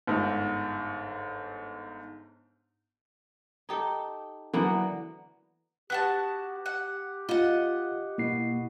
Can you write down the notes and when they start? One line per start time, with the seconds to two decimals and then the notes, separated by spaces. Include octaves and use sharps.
0.07 G1 G#2
3.69 D#4 G4 A4
4.54 D3 E3 F#3 A#3 B3
5.90 B3 F#4 G4 A5 F#6
6.66 F#5
7.29 F4 D#5 F#5
8.18 B2 A#3 E4 C7